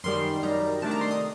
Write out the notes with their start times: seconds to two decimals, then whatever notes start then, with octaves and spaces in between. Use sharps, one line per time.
0.04 F#2 D#3 G3 C6
0.43 F#2 D#3 G3 A#5
0.82 C3 D#3 A3 D4 A5
0.91 A#5
1.01 C6
1.11 D#6